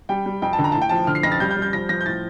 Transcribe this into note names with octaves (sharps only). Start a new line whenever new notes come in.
G3 G5
G3
F2 G5
A5
D3
A#5
A2 A5
G5
F3 A5
D3 F6
C7
F2 A#6
A6
G3 G6
G6
G3
G6
F3 A#6
F3 A#6
G6
A2 A6